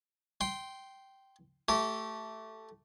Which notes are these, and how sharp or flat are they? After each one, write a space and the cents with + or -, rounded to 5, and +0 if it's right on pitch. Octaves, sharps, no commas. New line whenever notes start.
G5 -10 C6 +0
A3 +0 G4 -25